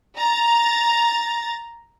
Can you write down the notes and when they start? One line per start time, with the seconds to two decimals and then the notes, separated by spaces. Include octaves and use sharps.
0.18 A#5 A6